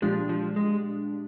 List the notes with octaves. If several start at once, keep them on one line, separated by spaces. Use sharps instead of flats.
A#2 F3 G#3 D4 G4
F3
G#3